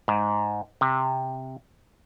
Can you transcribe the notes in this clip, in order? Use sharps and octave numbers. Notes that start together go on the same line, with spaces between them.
G#2
C3